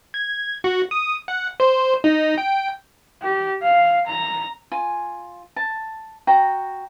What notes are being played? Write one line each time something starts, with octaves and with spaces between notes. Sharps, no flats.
G#6
F#4
D#6
F#5
C5
D#4
G5
G4
F5
A#5
F4 G#5
A5
F#4 G5 A#5